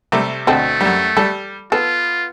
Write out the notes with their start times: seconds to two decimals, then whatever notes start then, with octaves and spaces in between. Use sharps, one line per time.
0.12 C3 G3 A3
0.47 D2 B2 A3 C4 A4
0.81 F#2 G3
1.17 G3 A4
1.72 B3 F4 A4